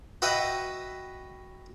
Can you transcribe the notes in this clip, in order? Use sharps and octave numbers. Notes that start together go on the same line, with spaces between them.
F#4 B4 D#5 E5 F#5 G5